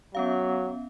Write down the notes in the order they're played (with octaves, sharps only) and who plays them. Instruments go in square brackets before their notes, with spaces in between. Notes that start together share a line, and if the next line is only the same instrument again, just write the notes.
[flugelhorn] F#3 [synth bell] B3 C#4 F5